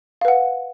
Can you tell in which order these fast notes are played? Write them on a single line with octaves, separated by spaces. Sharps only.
F5 B4 F#5